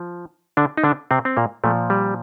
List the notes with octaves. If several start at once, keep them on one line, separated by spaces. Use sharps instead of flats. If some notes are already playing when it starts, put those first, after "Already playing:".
Already playing: F3
D3 D4
D#4
D3 D4
C3 C4
C4
A#2 A#3
A#2 F3 A3
G3